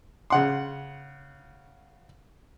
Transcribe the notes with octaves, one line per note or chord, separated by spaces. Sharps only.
C#3 F#5 C6